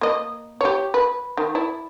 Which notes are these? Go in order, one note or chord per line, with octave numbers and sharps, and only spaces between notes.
A#3 D#5
G4 C#5
B4
D#3
E4 D5